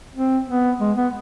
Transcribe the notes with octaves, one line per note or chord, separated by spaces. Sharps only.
C4
B3
G#3
B3